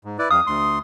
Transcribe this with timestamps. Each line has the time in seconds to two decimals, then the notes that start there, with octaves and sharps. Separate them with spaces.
0.05 G#2
0.19 E4 B4 D5
0.31 F2 F5 D#6
0.47 D2 C6